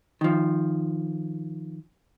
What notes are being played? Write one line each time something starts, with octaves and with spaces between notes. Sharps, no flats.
D#3 F3